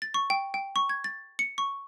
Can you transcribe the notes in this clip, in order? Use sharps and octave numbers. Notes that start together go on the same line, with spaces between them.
A6
C#6
G5
G5
C#6
G#6
A6
C#7
C#6